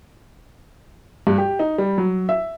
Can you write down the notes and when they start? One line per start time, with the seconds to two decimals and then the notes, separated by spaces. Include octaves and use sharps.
1.27 G2
1.38 G4
1.59 D#4
1.78 G3
1.98 F#3
2.29 E5